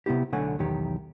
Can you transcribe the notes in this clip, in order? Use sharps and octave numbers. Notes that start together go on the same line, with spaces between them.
C3 B3 E4 G4
B1 D3 A3 C#5 F#5 G#5
B1 E2 D#3 G4 C#5